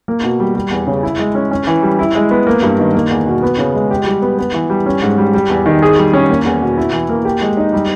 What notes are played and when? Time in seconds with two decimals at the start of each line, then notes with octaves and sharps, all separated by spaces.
0.08 A#3
0.23 B2
0.40 G3
0.55 G3
0.71 E2
0.87 C#3
1.03 E4
1.19 G#3
1.35 C#4
1.51 C#4
1.67 E3
1.83 G3
1.99 E4
2.15 G#3
2.31 B3
2.47 A#3
2.63 G2
2.79 D#3
2.95 A#3
3.11 E2
3.27 B2
3.43 B3
3.58 C#3
3.74 G#3
3.91 G4
4.07 G3
4.22 B3
4.38 B3
4.54 E3
4.70 G3
4.86 C#4
5.02 G#2
5.18 G3
5.34 G3
5.50 E2
5.66 D#3
5.82 G#4
5.98 G3
6.13 C#4
6.30 A#3
6.46 E2
6.62 B2
6.78 E4
6.93 E3
7.09 A#3
7.25 G4
7.41 G#3
7.57 D#4
7.73 G3